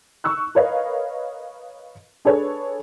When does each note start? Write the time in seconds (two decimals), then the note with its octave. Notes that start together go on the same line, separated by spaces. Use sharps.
0.24 C#6 E6 F#6
0.55 A#4 B4 C#5 D#5 F5
2.25 D4 G#4 A4 B4 C#5